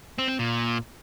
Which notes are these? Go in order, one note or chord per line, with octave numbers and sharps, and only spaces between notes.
C4
C4
A#2